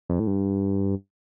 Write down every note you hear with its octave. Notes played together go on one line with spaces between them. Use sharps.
F2
A2
G2